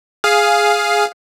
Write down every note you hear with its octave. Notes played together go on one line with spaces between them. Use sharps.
G#4 F5